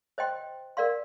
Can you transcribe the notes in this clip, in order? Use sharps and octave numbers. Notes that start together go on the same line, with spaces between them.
C5 D#5 G5 C6
A#4 D5 F5 C6